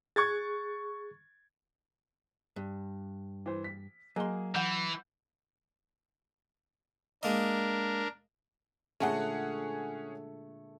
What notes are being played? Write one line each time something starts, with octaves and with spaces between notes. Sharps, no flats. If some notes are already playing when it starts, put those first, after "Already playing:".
G#4 C#6 F#6 G#6 A6
G2
E3 C5
B6
F#3 A#3 G#4 D#5 C6
E3 F#5 G6 E7
G#3 A#3 D4 A#4 D#5
A#2 D3 G#3 A3 C#4 G#4 F#5